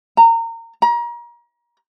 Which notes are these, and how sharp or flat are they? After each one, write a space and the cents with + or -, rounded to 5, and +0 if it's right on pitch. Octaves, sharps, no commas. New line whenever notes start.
A#5 -25
A#5 +35